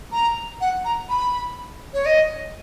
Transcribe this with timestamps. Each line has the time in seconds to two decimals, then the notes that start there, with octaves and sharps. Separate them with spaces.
0.12 A#5
0.61 F#5
0.85 A#5
1.09 B5
1.94 C#5
2.06 D#5